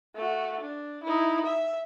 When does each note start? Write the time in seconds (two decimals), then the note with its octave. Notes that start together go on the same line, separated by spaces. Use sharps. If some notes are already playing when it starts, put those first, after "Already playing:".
0.16 A3 F#4
0.61 D4
1.04 D#4 E4
1.46 E5